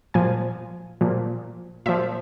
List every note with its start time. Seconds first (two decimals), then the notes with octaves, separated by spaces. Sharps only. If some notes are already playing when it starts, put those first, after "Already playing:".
0.14 A#2 F3 G#5
1.01 A#2 F3
1.86 A#2 F3 E5